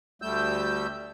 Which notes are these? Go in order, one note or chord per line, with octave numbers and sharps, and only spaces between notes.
D2 G3 A3 E6 G6